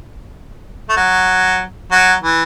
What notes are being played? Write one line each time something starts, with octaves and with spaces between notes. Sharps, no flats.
A3
F#3
F#3
E3